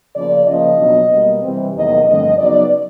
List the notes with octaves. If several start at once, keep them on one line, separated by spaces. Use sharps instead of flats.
C#3 F3 A#3 D5
C#3 F3 A#3 C#4 D#5
B2 F#3 B3 D4
B2 G3 A#3
C3 E3 G3 C4
E2 C3 D#3 F#3 A#3 D#5
G2 D3 F3 A3 C4 D#5
C#3 F#3 B3 D#4 D5